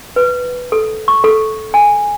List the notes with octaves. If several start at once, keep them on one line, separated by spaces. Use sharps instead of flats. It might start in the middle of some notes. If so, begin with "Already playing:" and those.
B4
A4
C#6
A4
G#5